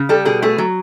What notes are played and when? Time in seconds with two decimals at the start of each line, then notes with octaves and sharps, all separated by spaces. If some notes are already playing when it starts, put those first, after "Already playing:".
Already playing: C#3
0.09 G3 A4
0.25 B2 G#4
0.42 A3 G#4
0.58 F#3